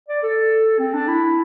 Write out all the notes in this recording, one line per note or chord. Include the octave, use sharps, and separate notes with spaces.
D5
A4
C4
D4
E4